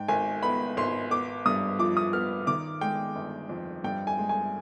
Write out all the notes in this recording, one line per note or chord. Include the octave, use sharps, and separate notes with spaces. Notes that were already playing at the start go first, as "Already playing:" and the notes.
Already playing: G#2 G5
G#1 G#5
B3 B5
G#1 C6
B3 D6
G2 D#6
F3 D6
D#6
B3 F6
D#3 D6
G#3 G5
G1
F2
G2 G5
G#5
G#3
G#5